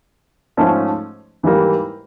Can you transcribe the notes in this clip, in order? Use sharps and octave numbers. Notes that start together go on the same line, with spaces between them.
G#2 F3 A3 C#4
G#2 E3 G3 A#3